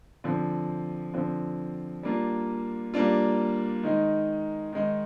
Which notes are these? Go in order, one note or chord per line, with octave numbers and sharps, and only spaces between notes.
D3 F3 C4
D3 F3 C4
G3 A#3 D4 F4
G3 A#3 D4 F4
D#3 G#3 D#4
D#3 G#3 D#4